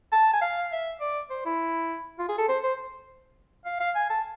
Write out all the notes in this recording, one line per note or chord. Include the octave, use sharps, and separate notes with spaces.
A5
G#5
F5
E5
D5
C5
E4
F4
G#4
A4
C5
C5
F5
F5
G#5
A5